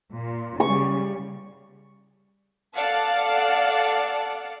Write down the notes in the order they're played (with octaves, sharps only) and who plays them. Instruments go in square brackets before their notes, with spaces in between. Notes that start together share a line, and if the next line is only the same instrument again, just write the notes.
[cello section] A#2
[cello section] C#3 G3 [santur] C#6
[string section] A4 D5 F5 F#5 A5